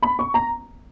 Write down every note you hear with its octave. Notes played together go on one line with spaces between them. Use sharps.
B5
C#6
A#5